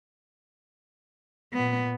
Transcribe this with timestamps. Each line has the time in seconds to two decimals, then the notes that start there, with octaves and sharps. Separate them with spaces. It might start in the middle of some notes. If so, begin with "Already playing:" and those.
1.54 A#2 B3